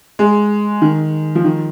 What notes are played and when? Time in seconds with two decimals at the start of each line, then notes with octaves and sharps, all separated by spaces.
0.19 G#3
0.82 D#3
1.35 F3
1.45 D#3